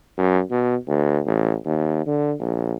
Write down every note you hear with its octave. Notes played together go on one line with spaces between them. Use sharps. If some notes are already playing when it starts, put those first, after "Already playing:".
F#2
B2
D2
A1
D#2
D3
A#1